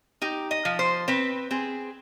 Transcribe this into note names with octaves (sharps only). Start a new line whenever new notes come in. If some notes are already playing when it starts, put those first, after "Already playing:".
D#4 G4
D#5
F3
C5
C4 B4
C4 G#4